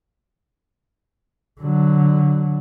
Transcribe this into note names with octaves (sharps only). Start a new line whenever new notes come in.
D3 F#3